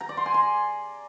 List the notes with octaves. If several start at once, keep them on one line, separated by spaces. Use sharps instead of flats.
A#5
D5
C6
G#5
C6